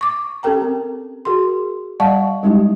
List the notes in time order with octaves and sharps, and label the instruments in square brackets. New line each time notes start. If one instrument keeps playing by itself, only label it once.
[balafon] C#6 D6
C#4 G4 A4 A#4 G5 A#5
C4
F#4 G#4 A#4 C6
G3 D5 F5 F#5 A5 C#6
G3 G#3 C#4 D#4 E4 G4